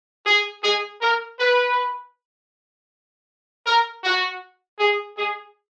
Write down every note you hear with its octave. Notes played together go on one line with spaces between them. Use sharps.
G#4
G#4
A#4
B4
A#4
F#4
G#4
G#4